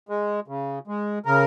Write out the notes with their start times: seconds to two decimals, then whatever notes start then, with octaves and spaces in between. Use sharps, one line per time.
0.09 G#3
0.48 C#3
0.87 G#3
1.25 C#3 A#4